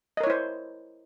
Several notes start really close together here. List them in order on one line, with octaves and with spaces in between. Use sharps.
D#5 A#4 C#5 E4 C5